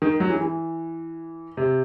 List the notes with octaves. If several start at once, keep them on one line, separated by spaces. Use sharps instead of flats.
D#3
F#3
E3
E3
C3